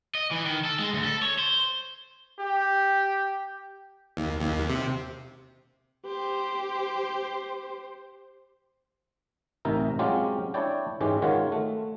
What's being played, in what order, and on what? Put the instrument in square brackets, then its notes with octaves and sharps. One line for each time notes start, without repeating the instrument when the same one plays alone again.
[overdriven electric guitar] D#5
E3
D#3
A4
G#3
D2
A4
C#5
C5
[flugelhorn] G4
[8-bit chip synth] D#2
D#2
C3
[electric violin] G4 C5
[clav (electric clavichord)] A1 C3 D#4 A#4 E5
F#3 G#3 C4 C#4 F4 G4
D4 E4 C#5 D5 G5
G#2 E3 G#3 C#4 G4
D#3 G#3 F4 F#4 C#5
A3